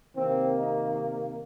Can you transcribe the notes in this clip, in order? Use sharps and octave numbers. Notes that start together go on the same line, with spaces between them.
C3 D#3 A#3 C4
D#4